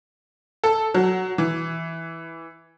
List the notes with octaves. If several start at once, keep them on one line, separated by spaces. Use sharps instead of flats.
A4
F#3
E3